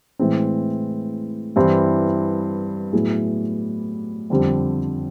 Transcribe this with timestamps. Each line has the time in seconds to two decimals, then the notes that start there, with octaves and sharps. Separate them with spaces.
0.19 A2 E3 G#3 C4
1.56 G2 E3 G3 C4 E4
2.93 A2 F#3 B3 E4 G#4
4.30 F2 D3 G3 C4